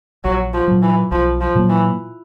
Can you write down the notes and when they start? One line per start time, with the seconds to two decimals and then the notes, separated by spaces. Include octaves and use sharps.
0.24 A#1 F#3
0.53 F3
0.68 A#2 F#3
0.82 E3
1.11 B1 F3
1.41 F3
1.55 A#2 F#3 A#3
1.69 E3